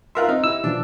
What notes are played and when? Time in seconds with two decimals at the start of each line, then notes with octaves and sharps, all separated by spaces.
0.15 F4 A#4 E5 C6 F6 F#6
0.29 C4 D#4
0.44 E4 G4 E6
0.64 B2 E3 F3 D4